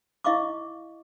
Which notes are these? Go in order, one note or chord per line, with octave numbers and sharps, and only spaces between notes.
E4 D#5 F5 C#6 D6